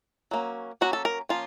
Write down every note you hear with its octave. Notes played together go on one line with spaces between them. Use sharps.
F#3 A#3 C#4
F#3 A#3 C#4 F#4
A4
A#4
F3 A#3 C#4 F4